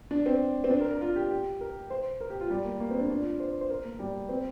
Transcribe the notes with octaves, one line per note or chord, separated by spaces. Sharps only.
D4
C4
C4
D4
A#4
A#4
F4
G4
G4
A#4
C5
A#4
G4
F4
G3
A#3
A#3
C4
D4
D4
F4
C5
C5
A#4
A#3
G3
C4